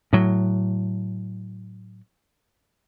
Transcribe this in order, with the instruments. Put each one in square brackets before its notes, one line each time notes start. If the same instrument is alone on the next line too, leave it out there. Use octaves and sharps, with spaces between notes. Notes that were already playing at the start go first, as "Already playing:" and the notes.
[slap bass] A2 F#3